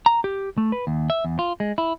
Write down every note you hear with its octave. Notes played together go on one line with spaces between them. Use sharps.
A#5
G4
A3
B4
D#2
E5
E2
F4
G#3
E4